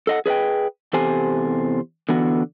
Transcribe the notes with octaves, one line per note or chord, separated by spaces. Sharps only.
A4 D#5 F#5
G#4 B4 D5 D#5 G5
E2 C3 G4 A4 C5 G#5
D3 E3 B3 F#4